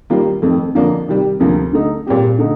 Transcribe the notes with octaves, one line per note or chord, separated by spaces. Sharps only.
D#3 G3 A#3 F4
F2 D#3 A3 C4
F2 D3 F3 A#3 D4
C3 D#3 G3
D2 C3 F3 A#3
D3 A3 D#4
A#2 G3 C4 G4
D3 A3 D#4